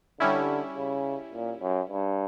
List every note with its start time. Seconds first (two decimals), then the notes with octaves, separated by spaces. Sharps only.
0.20 D3 G3 C#4 E4
0.76 C#3
1.34 A#2
1.62 F#2
1.89 G2